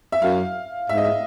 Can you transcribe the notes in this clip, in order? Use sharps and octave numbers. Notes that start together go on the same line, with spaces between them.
E5
F#2 F5
G#2 E5
D#5
E5